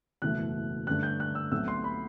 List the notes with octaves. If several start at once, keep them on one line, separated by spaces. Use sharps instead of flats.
F#1 E2 B2 A3 F#6
G2 D3 A3 D4 F#6
G6
F#6
E6
B1 B2 A3 C4 E6
C6
B5